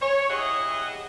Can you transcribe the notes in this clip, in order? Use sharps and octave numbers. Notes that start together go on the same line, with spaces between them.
C#5
E4 G4 G#4 D#5 E5 F#5